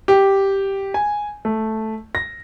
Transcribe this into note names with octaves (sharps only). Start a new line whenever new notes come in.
G4
G#5
A3
A#6